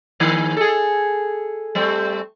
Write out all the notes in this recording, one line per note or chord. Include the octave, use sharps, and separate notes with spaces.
G#2 D#3 A#3
G#4 A4
G3 A3 C4